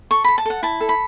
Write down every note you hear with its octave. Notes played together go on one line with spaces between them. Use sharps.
A4 C#6
A4 B5
A5
A4 F#5
E4 A5
A4
B5